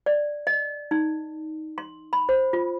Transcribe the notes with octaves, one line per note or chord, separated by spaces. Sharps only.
D5
D#5
D#4
C6
B5
C5
F4